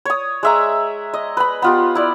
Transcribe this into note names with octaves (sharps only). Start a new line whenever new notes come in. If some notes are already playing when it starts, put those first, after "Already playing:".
C#5 D#6
G#3 E5 A#5
D#5
B4 B5
B3 F4 G4
E4 D5